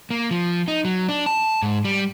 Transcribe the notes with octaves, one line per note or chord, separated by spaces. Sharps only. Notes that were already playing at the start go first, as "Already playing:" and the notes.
A#3
F3
D#4
F#3
D4
A5
G#2
G3